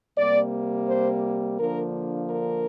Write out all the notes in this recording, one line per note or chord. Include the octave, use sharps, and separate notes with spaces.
C3 G3 A#3 D5
C5
D3 F3 A#3 D4 A#4
A#4